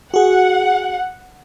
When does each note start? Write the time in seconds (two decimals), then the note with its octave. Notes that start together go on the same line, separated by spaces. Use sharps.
0.14 F#4 G#4 F#5